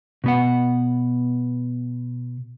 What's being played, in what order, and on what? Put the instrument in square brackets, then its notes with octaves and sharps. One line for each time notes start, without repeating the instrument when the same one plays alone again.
[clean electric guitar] B2 B3 F#5